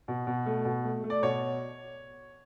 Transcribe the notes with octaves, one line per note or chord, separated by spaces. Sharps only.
B2
B2
A3
B2
A3
A3
D5
B2 C#5